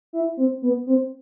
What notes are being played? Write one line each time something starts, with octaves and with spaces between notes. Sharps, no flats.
E4
C4
B3
C4